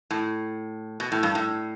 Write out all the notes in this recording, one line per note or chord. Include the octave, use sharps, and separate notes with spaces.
A2
B2
A2
G2
A2